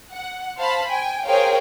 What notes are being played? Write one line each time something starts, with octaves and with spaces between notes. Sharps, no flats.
F#5
C5 F5 A5 B5
G5 G#5
G#4 A#4 C5 C#5 F5 G5